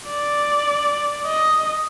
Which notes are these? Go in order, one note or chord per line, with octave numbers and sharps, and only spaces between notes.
D5
D#5